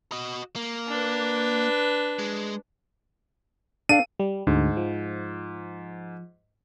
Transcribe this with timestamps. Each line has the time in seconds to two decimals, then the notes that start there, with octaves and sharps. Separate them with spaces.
0.12 F#4 D#5
0.56 A#3
0.88 D4 B4
2.19 G#3
3.89 D4 A4 F5 G5 D#7
4.19 G3
4.47 D2 G#2
4.77 F3